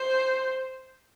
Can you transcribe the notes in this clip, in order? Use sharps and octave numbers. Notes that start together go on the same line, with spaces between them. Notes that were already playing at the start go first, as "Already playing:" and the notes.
Already playing: C5